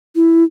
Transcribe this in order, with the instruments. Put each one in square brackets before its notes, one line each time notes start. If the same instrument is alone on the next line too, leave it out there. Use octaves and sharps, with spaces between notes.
[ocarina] E4